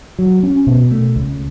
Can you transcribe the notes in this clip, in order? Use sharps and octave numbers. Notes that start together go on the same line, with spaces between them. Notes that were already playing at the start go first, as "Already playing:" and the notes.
F#3
C#4
B2
A3
C#2